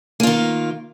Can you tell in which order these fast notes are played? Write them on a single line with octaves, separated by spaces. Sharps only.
A#3 F4 D#3